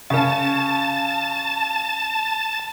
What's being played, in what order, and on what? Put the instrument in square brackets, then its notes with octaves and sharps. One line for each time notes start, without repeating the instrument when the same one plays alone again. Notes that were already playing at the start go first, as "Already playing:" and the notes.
[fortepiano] C#3 C#4 [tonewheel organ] A5